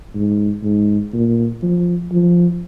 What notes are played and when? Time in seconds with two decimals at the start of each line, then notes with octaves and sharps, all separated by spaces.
0.15 G#2
0.63 G#2
1.14 A#2
1.63 F3
2.12 F3